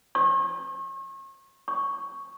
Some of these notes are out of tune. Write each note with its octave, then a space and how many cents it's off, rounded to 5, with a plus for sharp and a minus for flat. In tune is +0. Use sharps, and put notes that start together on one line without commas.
C#6 -40
C#6 +0